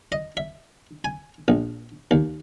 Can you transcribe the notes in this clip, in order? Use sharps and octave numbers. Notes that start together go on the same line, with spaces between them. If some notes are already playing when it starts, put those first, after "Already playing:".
D#5
E5
G#5
A#1
D#2